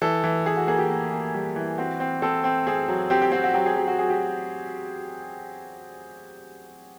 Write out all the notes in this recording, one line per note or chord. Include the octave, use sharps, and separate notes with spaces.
E3 A4
E3
E3 G#4
F#4
A#3 G#4
G4
A#3
A#3
G3
E3
C4 F#4
C4
C4 A4
C4
C4 G#4
F#3
C4 G4
G4
C4 F#4
F#4
F#3 G4
G#4
F#3 G4
F#4
F#3 G#4
G4